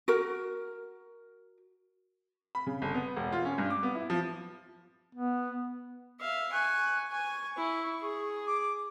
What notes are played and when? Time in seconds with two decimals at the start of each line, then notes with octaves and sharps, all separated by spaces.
0.08 F#4 A#4
2.55 B5
2.67 C#3
2.82 G1
2.94 B3
3.17 E1
3.32 F4
3.45 C#4
3.58 G2
3.70 D6
3.83 B3
3.95 E4
4.10 F3
5.15 B3
6.21 E5 F5
6.52 G#5 C#6 F#6
7.12 G#5 C#6
7.57 E4
8.01 G#4
8.47 D6